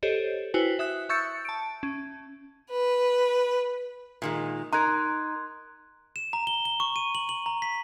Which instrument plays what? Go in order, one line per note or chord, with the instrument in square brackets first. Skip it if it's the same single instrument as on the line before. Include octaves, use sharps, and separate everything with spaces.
[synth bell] G4 A4 C5 C#5 D#5
E4 F#4 B4 C5 G5 G#5
E5 D#6 F#6
E5 C#6 E6 G6 A6 C#7
A5 D7
C#4
[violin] B4
[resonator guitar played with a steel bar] A#2 D#3 G#3
[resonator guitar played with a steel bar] D#4 A#4 [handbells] A#5 [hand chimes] C6 F#6 G#6
[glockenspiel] E7
A#5
G7
G7
C#6
D#7
F#7
F#7
A#5
B6